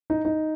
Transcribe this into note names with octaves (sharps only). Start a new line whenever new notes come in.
D#4
D#4